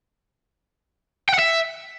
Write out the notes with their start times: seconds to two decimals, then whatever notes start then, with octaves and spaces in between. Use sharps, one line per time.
1.29 G5
1.34 F#5
1.39 E5